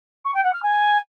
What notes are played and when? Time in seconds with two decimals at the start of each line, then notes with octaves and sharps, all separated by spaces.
0.25 C#6
0.34 G5
0.43 F#5
0.53 F6
0.62 G#5